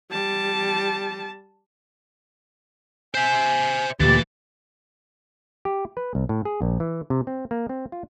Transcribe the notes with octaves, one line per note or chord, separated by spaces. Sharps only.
G3 A5
C5 E5 G#5
D2 A#2 E3 G4 A6
G4
B4
C2
A2
G#4
A#1
E3
C3
C4
A#3
C4
F4